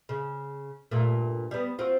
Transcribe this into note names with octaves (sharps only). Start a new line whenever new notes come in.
C#3
G2 A#2 A3
G3 B3
C4 F4 F#4